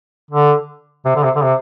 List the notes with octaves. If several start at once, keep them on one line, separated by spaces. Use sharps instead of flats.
D3
C3
D3
C3
D3
C3